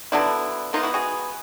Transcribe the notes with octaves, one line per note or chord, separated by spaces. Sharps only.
D3 F#3 B3 D4 E4
E3 G#3 B3 D#4 F4
E4 F#4
F#4 G#4